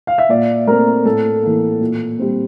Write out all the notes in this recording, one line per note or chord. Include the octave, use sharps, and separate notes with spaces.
F5
E5
A#2 D5
A3 C4 A#4
A2 A4
E3 A#3
A#2
G3 C4